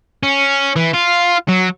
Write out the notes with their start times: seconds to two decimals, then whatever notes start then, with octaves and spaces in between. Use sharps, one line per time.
0.23 C#4
0.76 E3
0.93 F4
1.48 F#3